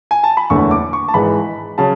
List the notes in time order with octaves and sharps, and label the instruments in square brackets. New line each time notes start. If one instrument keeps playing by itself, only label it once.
[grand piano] G#5
A5
B5
F#1 E2 D3 A3 C#6
D6
C#6
A5
G#1 G#2 E3 G#3 B5
C#3 F#3 C#4 A5